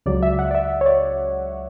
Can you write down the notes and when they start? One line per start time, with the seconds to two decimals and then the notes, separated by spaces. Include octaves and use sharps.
0.06 C#2 C#3 F#3 D5
0.23 E5
0.39 F#5
0.51 D5
0.55 E5
0.81 C#5
0.86 D5